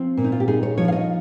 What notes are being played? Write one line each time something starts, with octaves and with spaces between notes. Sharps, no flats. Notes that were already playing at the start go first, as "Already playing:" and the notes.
Already playing: F3 C4
A#2
D#4
F4
G4
D#4 G#4
C#5
F3 C#5
F5
D#5